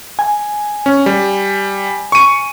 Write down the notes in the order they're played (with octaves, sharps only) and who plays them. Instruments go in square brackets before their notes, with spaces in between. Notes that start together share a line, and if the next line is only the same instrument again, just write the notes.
[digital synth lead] G#5
[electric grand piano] C#4
G3
C#6 D#7